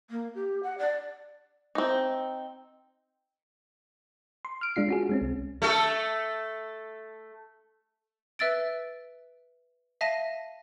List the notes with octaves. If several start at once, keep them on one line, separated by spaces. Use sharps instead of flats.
A#3
G4
F#5
D5
C4 D#4
C6
F6 D7
G#3 D4 F4 C7
C#4 F#4 G#4
G#3 C4 C#4
C2
A3 A4
B4 E5 E6 A6 D7
E5 F5 A5 A#6 D#7